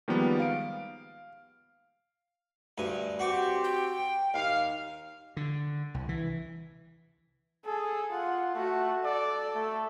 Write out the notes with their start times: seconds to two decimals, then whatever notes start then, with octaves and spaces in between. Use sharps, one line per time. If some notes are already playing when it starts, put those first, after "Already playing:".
0.08 D#3 F3 G3 G#3 A#3 B3
0.39 F5 D7
2.78 D2 G2 G#5
3.19 C4 F#4 G4 C#6 D6
3.64 G5
4.34 D#2 F5
5.37 D3
5.94 C2
6.09 E3
7.65 G#4 A4
8.11 F4 F#5
8.55 A3 F#4
9.04 A4 D5
9.55 A3